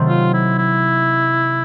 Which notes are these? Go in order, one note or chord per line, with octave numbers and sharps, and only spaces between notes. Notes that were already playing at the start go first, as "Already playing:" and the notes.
Already playing: C3 D#3 F#3 A3 C4
F4
E4
E4